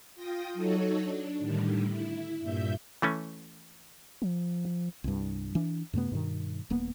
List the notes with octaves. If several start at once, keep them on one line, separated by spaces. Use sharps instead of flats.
F4 G5 D#6 A#6
F#3 D#4 F#4 A4 C#5
D4
A2 D3 D#3 G3
E4
G2 A#2 E5 G6
E3 A3 C#4
F3
C2 G2
E3 D4
F#2 C3 A3 B3
G2 B2 D#3
D#1 A#3 B3